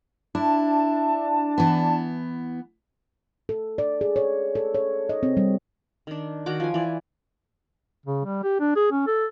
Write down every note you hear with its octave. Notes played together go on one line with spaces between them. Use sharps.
D4 E4 A5
E3 B3
A4
D5
G#4
C#5
A4
C#5
D#5
C4
G3
D#3 D4
D#3 F#4 F#5 D6
F3 G#5
E3 D5
C#3
G3
G4
D4
G#4
C#4
A4